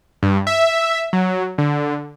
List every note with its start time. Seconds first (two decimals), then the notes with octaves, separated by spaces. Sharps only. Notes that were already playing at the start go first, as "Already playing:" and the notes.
0.23 G2
0.47 E5
1.13 F#3
1.58 D3